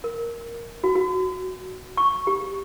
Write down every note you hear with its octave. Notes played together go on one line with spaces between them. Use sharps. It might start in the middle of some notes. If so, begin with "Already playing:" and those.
A#4
F#4
F#4
C#6
G4